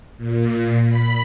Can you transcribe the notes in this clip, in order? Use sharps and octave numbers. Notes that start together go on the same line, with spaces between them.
A#2
B5